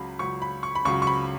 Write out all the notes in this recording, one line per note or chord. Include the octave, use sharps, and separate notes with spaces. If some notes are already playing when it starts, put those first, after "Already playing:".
Already playing: C#2 C#3 F#3 B5
C#2 C#3 F#3 C#6
B5
C#6
B5
C#2 C#3 F#3 C#6
C#6
B5